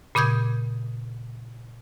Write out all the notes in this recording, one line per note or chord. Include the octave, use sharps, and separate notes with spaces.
A#2 C#3 D#6 G6 G#6